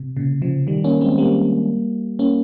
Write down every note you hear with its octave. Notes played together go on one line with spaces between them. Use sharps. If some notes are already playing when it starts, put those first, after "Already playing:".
Already playing: C3
A#2 C#3
C#3 F3
D#3 G3
A#3 C#4
G#3 C4
G3 A#3
A#3 C#4